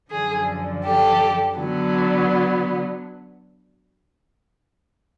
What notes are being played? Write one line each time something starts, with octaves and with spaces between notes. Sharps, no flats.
F#2 D3 F3 G#4
G4 A4
D3 F#3 B3